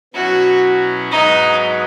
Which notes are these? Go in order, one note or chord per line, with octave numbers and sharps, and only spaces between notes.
B2 F#3 C#4 E4 F#4
G#2 F#3 B3 D#4